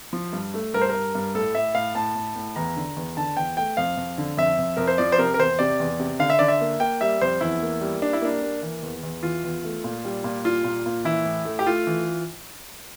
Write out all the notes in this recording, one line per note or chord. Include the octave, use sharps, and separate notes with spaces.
F3
G2
A3
G2 A#4
C5
A#4
G2
G2
A2 A4
A2 E5
A2 F5
A2 A5
A2
A2
E2 A#5
D3
E2
D3 A5
E2 G5
A3 G5
F2 F5
F2
D3
F2 E5
F2
F2 A#4
C5
F3 D5
C5
C3 A#4
A#4
E2 C5
C3 D5
E2
C3
D3 F5
E5
D3 D5
E5
A#3
A#3 G5
G3 E5
F2 C5
E2 E4
A#3
G3
G3 D4
E4
A#3 D4
A#3
E3
E2
E2
E3 F4
E2
A3
A#2
G3
A#2
G3 F4
A#2
A#2
E3 E4
A2
A3
G4
A3 F4
E3